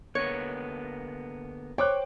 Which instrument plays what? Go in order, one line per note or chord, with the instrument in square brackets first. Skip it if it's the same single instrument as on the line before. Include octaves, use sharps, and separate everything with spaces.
[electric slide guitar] D3 A#3 B3 [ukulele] C#5
[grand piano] C5 D6 F#6 [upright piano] C#5 [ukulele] G5